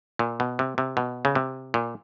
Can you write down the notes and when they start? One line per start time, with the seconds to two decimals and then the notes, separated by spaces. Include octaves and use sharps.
0.19 A#2
0.40 B2
0.59 C3
0.78 C3
0.97 B2
1.25 C#3
1.35 C3
1.74 A#2